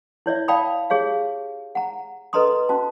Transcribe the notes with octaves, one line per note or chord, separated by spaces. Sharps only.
E4 C#5 D5 E5
D5 F5 G5 A5 B5 D#6
G4 G#4 C#5 F5
F#5 A#5
A4 B4 D#5 A#5 C6 D#6
C#4 F#4 A5